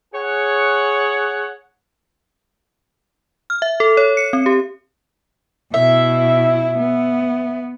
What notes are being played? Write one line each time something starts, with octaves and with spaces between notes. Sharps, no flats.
G#4 C#5 F#5
F6
E5
A4
C#5
C#7
C4
G4
B2 E4 E5
B3